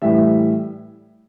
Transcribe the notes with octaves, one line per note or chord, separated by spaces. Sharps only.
A2 E3 G3 E5